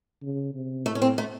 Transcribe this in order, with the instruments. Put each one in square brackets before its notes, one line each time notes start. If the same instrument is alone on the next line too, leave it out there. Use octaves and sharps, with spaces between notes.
[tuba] C#3
C3
[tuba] A2 [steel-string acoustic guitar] A3
[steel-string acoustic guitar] C#4
C4
A3